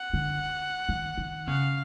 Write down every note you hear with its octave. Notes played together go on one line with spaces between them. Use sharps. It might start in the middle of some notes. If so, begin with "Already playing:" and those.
Already playing: F#5
D3
D#3
D#3
C#3 F5